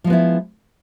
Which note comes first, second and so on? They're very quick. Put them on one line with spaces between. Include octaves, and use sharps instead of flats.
F3 G#3 B3 E4